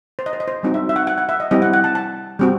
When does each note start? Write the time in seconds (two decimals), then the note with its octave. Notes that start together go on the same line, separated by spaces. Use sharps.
0.19 C5
0.26 D#5
0.33 C5
0.40 D#5
0.48 C5
0.63 G3 C4 D#4 F#4
0.74 E5
0.89 E5
0.96 F#5
1.07 F#5
1.18 F#5
1.29 E5
1.40 D#5
1.51 G3 C4 E4 G4 D#5
1.62 F#5
1.73 F#5
1.84 A5
1.95 A5
2.39 G3 C4 F#4